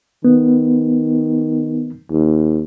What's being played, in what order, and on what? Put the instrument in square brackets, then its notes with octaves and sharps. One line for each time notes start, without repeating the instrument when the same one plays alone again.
[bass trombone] D#3 [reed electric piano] B3
[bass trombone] D#2